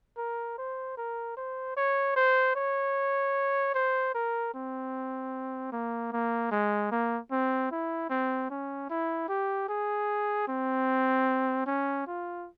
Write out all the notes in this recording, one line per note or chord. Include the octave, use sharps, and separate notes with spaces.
A#4
C5
A#4
C5
C#5
C5
C#5
C5
A#4
C4
A#3
A#3
G#3
A#3
C4
E4
C4
C#4
E4
G4
G#4
C4
C#4
F4